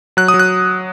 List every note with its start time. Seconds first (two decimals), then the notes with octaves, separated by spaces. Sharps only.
0.17 F#3 F#6
0.28 D#6
0.34 F#3
0.39 F#6